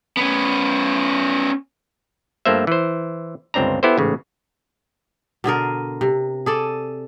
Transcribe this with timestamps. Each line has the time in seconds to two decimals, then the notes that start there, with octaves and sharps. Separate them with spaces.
0.17 B3 C#4
2.45 G2 F3 A3 A#3 C5 E5
2.67 E3 C5
3.54 G1 C#2 C4 D4 A#5
3.83 B3 E4 G4 A4 C5
3.98 A1 G#2 C#3
5.44 B2 D3 G#4 A#4
6.01 C3
6.46 G#4 A4 D5